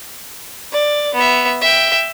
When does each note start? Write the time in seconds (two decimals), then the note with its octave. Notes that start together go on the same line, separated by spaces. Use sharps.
0.72 D5
1.15 B3 E5
1.61 E5 G5